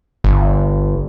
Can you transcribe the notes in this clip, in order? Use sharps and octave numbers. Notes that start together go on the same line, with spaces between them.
G1